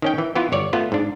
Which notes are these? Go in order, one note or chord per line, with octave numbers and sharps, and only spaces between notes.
D#3 C#4 G5
E3
E3 B3 E4 F4
G1 C#5 D5
A3 B3 F4
G#2 D4